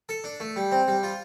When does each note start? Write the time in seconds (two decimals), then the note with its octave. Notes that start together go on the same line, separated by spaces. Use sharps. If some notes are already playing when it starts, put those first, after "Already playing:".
0.09 A4
0.24 D4
0.40 A3
0.56 G3
0.72 C4
0.88 G3
1.03 F4